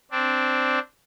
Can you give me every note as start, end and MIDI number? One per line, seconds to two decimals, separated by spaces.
0.11 0.79 60
0.11 0.79 62